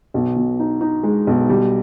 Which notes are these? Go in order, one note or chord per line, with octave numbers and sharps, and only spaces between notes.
B1
B2
D#4
D#4
G#3
B1
G3